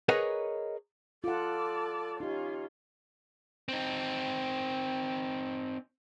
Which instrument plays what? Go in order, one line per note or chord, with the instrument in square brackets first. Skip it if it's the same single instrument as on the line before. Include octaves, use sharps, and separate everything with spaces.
[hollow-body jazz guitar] G#4 A#4 B4 C#5 D#5 F#5
[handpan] F4 F#5 [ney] A4 [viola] D5 A5
[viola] C#4 F4 [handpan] D#4 G4
[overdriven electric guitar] C4 D#4